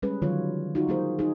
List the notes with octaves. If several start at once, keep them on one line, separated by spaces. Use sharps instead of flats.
G3 G#3 C#4 G#4 B4
D3 D#3 F#3 G3 F4 C#5
D#4 F4 F#4
F#3 A#3 G#4 C5
D#4 G#4